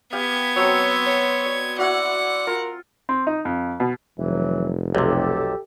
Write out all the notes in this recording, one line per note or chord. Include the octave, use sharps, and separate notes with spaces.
B3 G4 F5 G#6
F#3 C4 C#5
C#5
D5
E4 F#4 D5 F#5
F4 A#4
C4
D#4
F2
B2
F1 E3 F#3
B1 C3 G4 A4